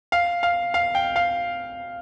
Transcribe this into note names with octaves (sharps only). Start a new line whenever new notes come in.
F5
F5
F5
G5
F5